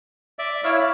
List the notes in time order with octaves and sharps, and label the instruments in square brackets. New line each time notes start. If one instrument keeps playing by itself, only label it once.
[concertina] D5 E5
[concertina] E4 C#5 F5 [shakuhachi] E5
[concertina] D5